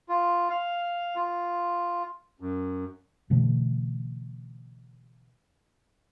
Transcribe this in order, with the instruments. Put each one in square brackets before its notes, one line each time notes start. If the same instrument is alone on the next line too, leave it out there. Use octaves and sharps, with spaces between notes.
[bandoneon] F4
F5
F4
F#2
[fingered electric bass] B2 D3 E3 A3